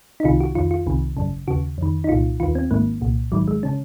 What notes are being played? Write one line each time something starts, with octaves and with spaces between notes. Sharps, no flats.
D#4
C2 C3 D#3 F4
F#4
F2 D#3 F4
F4
C2 C3 D#3
G#1 F#2 C#3
D#2 C#3 F#4
F2 D#3
D#4
C2 A#2 F4
D#2 D#3 F4
C4
G#1 G#2 D#3 A#3
C2 A#2
G#1 G#2 D#3 F#3
G#3
C#3 C#4